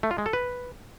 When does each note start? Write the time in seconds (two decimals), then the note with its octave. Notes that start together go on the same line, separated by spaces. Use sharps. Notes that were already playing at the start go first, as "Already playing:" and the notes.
0.03 A3
0.11 F4
0.18 G#3
0.26 A4
0.33 B4